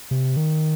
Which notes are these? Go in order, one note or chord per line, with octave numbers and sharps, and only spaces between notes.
C3
D#3